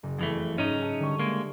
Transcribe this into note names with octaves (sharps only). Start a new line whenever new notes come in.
F#1
F2 E3 A3
G#2 C#4 D#4
B4 E5 A5
D3 G3 C#6
G#3 A#3